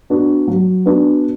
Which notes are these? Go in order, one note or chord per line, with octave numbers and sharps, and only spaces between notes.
B3 D4 F#4
F#3
B3 D4 F#4